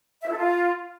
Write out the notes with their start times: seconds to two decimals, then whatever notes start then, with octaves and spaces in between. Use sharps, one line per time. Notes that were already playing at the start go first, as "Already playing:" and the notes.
0.22 E5
0.27 E4
0.32 A4
0.37 F4